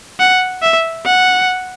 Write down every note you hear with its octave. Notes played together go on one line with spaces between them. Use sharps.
F#5
E5
F#5